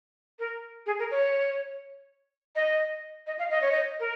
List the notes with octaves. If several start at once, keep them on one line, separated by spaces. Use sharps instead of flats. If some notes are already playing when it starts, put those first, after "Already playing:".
A#4
G#4
A#4
C#5
D#5
D#5
F5
D#5
C#5
D#5
A#4